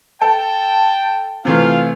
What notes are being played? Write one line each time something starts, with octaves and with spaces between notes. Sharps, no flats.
A4 G5 A5
C3 E3 A3 F4 F5